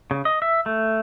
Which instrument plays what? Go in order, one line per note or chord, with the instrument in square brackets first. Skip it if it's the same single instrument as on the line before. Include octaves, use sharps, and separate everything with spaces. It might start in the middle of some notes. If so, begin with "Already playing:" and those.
[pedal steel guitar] C#3
D#5
E5
A3